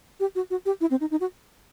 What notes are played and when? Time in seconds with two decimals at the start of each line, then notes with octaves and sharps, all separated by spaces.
0.20 G4
0.35 F#4
0.50 F#4
0.66 G4
0.81 E4
0.91 C4
1.01 D#4
1.11 D#4
1.21 F#4